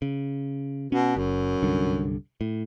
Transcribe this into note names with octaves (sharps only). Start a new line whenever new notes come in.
C#3
B2 C#4
F#1 F#2
C2 G2 D3
A2